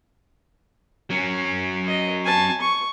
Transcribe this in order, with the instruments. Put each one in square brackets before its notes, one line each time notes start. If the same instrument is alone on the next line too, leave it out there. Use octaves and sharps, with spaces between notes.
[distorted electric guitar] F#3 C#4
[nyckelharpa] D#5
G#5 A5
C#6